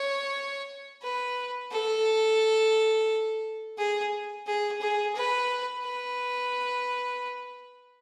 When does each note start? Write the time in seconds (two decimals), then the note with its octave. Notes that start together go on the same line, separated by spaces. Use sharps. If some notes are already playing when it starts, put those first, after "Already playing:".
Already playing: C#5
1.02 B4
1.72 A4
3.78 G#4
4.47 G#4
4.81 G#4
5.15 B4
5.84 B4